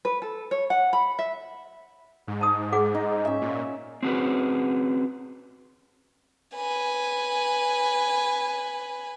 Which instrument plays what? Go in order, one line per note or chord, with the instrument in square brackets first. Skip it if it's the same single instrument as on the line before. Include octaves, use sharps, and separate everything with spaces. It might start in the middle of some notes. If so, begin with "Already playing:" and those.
[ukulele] B4
A4
C#5
F#5
B5
E5
[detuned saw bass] G#2
[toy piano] A5 D#6
G#4 F#5 D6
[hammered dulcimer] D#4
C#4 E5
[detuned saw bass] A#2
[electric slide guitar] C4 C#4 F#4 G#4 B4
[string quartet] B4 G#5